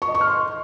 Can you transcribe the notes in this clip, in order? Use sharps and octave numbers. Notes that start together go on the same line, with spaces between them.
C#6
D#5
C#6
F6
C6